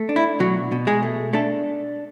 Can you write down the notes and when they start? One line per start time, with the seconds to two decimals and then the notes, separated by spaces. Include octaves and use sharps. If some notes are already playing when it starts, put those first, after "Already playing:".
Already playing: A3
0.09 D4
0.16 E4
0.40 B2 F#3 F#4
0.72 B2
0.87 G#3 G#4
1.03 A3
1.33 A3 D4 A4